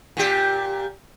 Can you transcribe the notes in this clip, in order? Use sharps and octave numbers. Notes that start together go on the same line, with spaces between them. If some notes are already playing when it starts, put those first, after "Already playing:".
A#2 G4